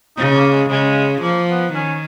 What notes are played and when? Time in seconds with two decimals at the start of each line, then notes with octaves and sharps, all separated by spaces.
0.17 C#3 D#4
0.35 A#3
0.52 G#3
0.69 C#3 G#3
1.22 F3 A#3
1.49 B3
1.74 D#3 C#4